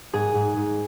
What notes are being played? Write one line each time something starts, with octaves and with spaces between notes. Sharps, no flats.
G#2 G#4
G#2
G#2